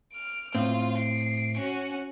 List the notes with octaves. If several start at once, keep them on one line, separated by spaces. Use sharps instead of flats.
F6 D7
A2 C4 F4
C7 D7
C#4 F#4